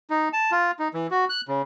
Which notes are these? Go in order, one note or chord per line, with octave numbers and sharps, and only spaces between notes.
D#4
A5
F4
D#4
E3
F#4
F#6
C#3